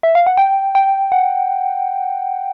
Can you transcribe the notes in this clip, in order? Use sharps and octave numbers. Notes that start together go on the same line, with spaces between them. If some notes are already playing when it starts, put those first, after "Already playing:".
E5
F5
F#5
G5
G5
F#5